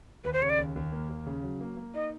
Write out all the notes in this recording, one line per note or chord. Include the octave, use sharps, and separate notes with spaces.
D#2 B4
C5
C#3 C#5
D5
D#2
D#2
A#3
D#2
C#3
F#3
A#3
A#3
D#4 D#5